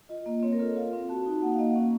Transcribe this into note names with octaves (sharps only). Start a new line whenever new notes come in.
F4 D#5
A#3 D#5
C4 C#5
A#4
F4 A4
F4 F5
C4
F#4 A5
D#4
A#3 F#5
F5
A#3 D#5
C#4